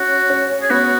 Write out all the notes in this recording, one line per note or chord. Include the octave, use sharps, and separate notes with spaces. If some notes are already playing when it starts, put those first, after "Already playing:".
Already playing: C#4 F#4
C#4
G#4
B3 F#4